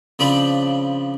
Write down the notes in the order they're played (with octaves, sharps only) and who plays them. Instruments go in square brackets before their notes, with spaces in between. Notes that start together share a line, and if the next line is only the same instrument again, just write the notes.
[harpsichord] C#3 F3 C4 D4 B5